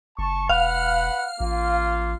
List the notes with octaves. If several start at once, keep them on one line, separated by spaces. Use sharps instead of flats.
F#1 A5 C#6
E1 B4 F5 F#5
A1 A#3 F4